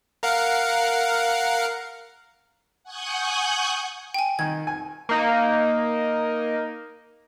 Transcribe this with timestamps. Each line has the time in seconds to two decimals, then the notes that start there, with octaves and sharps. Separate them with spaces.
0.23 A#4 F5 F#5
2.83 F#5 G#5 C#6 D#6 F#6 G6
4.14 G5 G#5
4.39 D#3 G#6
4.67 G#5
5.09 A#3 D#4